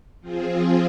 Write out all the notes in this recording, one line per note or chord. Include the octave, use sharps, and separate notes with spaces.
F3 C4 F4 G#4